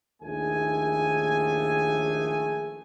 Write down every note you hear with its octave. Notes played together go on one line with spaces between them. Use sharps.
A#1 D#2 A3 G#4 G#5